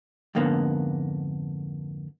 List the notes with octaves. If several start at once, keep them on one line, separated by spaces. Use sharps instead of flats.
F2 G#2 D3 A#3 B3